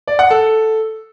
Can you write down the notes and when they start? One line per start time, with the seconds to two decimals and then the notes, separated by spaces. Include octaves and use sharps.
0.08 D5
0.19 F#5
0.30 A4